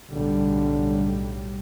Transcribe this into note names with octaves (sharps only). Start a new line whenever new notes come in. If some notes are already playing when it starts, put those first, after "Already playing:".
B1 A2 D3 G3